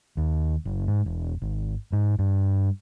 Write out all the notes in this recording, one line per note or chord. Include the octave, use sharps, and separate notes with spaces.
D#2
F#1
G#2
E1
G#1
G#2
G2